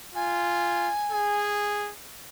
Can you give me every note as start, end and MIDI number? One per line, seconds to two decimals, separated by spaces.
0.15 0.91 65
0.15 1.51 80
1.12 1.92 68